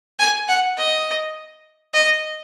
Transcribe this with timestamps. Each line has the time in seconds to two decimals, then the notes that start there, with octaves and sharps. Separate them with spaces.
0.19 G#5
0.48 F#5
0.78 D#5
1.94 D#5